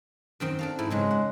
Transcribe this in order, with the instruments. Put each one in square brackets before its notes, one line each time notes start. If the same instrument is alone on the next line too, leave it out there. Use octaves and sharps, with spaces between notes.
[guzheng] F#2 D#3 C4
D4 A4 F5
[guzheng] G#2 [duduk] E4
[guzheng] F#2 C#3 F#3 [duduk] G#3
[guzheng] F#5